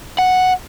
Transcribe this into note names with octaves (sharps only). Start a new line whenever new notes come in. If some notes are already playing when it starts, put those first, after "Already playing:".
F#5